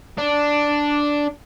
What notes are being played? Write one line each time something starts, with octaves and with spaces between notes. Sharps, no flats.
D4